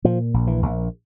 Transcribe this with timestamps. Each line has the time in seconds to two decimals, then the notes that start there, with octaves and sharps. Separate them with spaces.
0.04 A#2 F3
0.34 A#1
0.47 E3
0.62 A#1